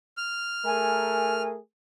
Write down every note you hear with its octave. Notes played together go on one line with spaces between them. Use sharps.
F6
A3 G#4 A#4 G#5